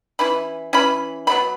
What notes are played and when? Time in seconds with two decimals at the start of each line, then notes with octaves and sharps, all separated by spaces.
0.19 E3 C#4 E4 B5
0.73 E3 C#4 E4 B5
1.27 B2 F#3 B3 B5